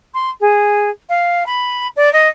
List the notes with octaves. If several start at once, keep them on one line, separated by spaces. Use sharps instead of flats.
C6
G#4
F5
B5
D5
D#5